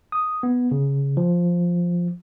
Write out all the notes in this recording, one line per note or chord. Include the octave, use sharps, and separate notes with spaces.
D#6
B3
C#3
F3